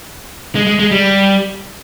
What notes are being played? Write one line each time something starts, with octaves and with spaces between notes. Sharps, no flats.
G#3
G#3
G#3
G3